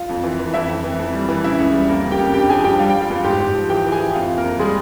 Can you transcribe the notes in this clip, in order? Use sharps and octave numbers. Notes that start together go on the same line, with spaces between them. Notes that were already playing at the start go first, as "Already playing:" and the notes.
Already playing: F4 F5
F2
E3
E3
F2 E4 E5
F2
E3
F2
G3
E3
C#3 E4 E5
C#2
G3
F2 A#3 A#4
C#3
G4 G5
F2
G2 G4 G5
F3 G#4 G#5
G2 G4 G5
G3 F5
G3 G5
F4 F5
E2
G#2 G4 G5
G#2
F3
E3 G4 G5
E3
G#4 G#5
E3
F2 F4 F5
F2
A#3 A#4
F2
G3 G#3 G#4